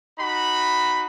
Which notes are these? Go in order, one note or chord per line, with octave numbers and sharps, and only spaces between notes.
D#4 F#4 B5